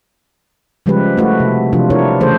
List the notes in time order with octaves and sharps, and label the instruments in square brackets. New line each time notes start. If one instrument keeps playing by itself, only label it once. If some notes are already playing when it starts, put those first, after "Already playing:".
[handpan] C#3 F3 G3 G#3 G4 B4
A3 E4 F#4 B4
C3
C3 E3 F3 D4 F4
D4 E4 F4 A#4 C#5
C#3 E3 A3 G#4 A4 C5